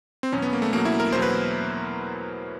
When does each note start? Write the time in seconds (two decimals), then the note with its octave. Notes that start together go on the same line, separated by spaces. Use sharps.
0.23 C4
0.32 E2 B2 F#3 C#4
0.42 B3
0.53 A#3
0.62 A3
0.72 E2 B2 F#3 A#3
0.85 E4
1.00 A#4
1.12 E2 B2 F#3 C5
1.22 B4